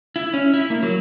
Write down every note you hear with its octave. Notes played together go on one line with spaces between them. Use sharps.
E4
C#4
E4
A#3
F#3